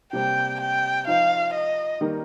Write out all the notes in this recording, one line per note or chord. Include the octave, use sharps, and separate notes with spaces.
C3 G3 A#3 G4 C5 G5
G5
F3 D#4 C5 F5
D#5
D#3 G3 A#3 D#4 A#4